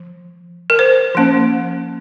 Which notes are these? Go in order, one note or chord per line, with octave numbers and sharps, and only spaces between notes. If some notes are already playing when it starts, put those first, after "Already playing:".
Already playing: F3
A#4
C5
F3 A#3 C#4